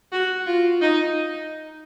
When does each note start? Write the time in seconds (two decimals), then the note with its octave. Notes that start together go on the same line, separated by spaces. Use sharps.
0.12 F#4
0.46 F4
0.81 D#4